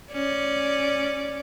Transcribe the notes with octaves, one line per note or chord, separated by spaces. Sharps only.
C#4 D5